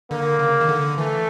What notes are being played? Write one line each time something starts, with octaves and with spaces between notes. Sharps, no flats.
D3 A#3
C#3
D#3
D3
E3 A3